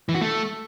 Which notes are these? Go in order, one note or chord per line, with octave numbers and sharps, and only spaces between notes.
E3
F#4
A3